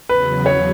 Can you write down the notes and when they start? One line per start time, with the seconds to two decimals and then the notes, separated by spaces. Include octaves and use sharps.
0.09 E2 C#3 F#3 B4
0.46 C#5